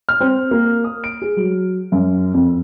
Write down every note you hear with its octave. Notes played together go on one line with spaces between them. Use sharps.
F6
C4
A#3
D#6
D7
G#4
F#3
F#2
F2